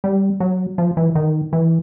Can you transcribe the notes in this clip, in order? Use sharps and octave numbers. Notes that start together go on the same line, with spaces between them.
G3
F#3
F3
E3
D#3
E3